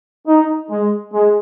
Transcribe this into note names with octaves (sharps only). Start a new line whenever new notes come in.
D#4
G#3
G#3